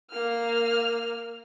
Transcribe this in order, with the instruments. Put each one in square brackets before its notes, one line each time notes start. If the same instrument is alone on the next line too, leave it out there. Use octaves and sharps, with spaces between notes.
[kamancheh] A#3 F6